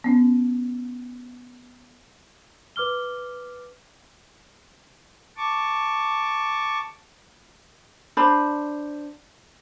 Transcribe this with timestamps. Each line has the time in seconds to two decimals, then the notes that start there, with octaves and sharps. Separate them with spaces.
0.04 B3 C#4
2.76 B4 D6 F6 G7
5.37 A5 C#6 D6
8.17 D4 C5 B5